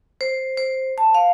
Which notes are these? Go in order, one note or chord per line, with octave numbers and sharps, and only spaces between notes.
C5
C5
A5
F5